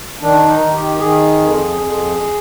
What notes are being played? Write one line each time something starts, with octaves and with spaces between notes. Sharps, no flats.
D#3 D4
D#4
D#3
G4
D#3 G#4
F2
F2